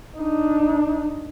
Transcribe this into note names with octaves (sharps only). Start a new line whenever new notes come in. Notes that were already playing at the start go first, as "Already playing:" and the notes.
D4 D#4